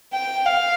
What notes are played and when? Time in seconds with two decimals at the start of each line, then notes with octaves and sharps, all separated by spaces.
0.13 G5
0.45 F5